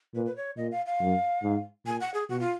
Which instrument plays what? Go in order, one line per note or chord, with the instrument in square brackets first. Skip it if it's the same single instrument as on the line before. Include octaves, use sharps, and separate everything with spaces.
[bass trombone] A#2 [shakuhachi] B4
[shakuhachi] B4
C#5
[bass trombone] A#2 [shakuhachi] D#5
[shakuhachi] F5
F5
[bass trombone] F#2
G#2
[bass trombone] A#2 [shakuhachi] G#5
[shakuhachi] F#5
G#4
[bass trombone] B2 [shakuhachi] F#4
[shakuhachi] F4